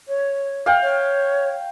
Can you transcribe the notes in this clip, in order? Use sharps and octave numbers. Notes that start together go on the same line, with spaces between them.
C#5
F5 G5
C#5